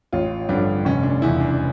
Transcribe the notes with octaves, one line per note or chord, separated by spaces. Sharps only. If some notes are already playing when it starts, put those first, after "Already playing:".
A1 F4
G2 D3 F3 D4
F1 C#4
D4
E2 C#3 E4
D4